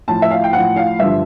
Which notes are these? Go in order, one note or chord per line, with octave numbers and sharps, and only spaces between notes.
A2 F3 A5
E5
F5
G5
A2 F3 F#5
F5
G2 D3 F3 E5